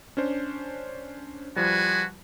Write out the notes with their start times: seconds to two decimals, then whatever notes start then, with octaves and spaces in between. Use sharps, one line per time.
0.17 C#4 D4 C5
1.56 F3 G3 F#4 B4 G#5